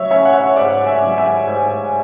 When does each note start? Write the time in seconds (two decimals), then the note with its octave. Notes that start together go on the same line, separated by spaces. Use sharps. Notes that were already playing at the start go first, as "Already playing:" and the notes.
Already playing: F#3 C#5 E5
0.11 C#4 C#5 E5
0.25 F#5
0.34 C#5 E5
0.56 G#2 D5 F#5
0.86 E5 G#5
1.02 F#3
1.18 E5 G#5
1.47 G#2